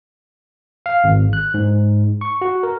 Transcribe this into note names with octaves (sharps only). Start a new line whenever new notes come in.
F5
G#1
F#6
G#2
C#6
F#4
A#4